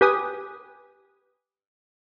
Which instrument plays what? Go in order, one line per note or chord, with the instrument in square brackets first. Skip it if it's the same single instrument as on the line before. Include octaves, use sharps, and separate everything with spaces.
[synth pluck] G4 B4 G#5 D#6